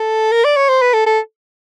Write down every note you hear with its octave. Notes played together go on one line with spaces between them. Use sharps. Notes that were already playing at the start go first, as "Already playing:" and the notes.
Already playing: A4
A#4
D5
C#5
C5
B4
A4
A4